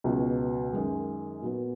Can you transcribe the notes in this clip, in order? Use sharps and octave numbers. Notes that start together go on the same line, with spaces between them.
C#2 B2 F#3 B3
F#2 D#3 G#3
A#2 F#3 B3